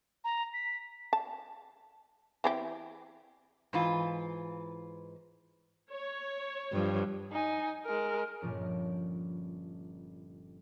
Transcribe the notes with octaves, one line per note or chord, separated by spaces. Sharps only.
A#5
B6
A5
E3 C4 G4
G#2 E3 F4
C#5
G2 F3
D#4 G#5
G#3 A#4
G1 A#2 F3 C#4 D7